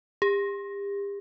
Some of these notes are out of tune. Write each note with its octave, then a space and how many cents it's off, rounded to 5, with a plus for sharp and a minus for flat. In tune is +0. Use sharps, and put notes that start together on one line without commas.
G4 +40